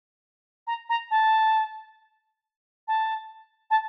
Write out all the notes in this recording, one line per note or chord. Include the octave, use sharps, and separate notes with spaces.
A#5
A#5
A5
A5
A5